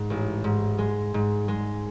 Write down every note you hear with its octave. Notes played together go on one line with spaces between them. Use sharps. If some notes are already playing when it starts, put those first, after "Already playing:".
Already playing: G#2
A1
G#2
G#3
G#2
G#3